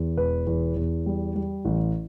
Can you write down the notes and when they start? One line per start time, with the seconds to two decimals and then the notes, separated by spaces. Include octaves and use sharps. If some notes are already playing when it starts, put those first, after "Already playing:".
Already playing: E2
0.17 E1 B4
0.47 E2
0.76 E2
1.06 G3
1.36 G3
1.65 A1